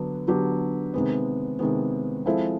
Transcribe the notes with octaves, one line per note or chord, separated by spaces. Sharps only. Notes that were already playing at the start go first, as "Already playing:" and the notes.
Already playing: D3 F#3 B3 D4
D3 F#3 B3 D4 G4
C3 D#3 G#3 B3
C3 D#3 G#3 B3
F3 G#3 C4 E4 A4